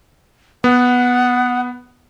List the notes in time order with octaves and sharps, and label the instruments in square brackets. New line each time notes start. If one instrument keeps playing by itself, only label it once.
[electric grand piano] B3 [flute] F#5